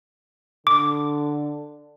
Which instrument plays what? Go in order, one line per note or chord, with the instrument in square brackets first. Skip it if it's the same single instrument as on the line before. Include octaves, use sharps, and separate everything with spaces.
[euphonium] D3 [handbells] D6